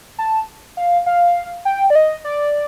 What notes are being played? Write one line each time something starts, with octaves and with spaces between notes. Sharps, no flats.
A5
F5
F5
G5
D5
D#5
D5